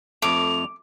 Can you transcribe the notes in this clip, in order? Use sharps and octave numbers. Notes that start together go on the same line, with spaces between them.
F2 A3 D6 F7